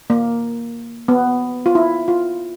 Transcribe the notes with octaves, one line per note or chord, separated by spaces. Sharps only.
A#3
B3
F4
E4
F4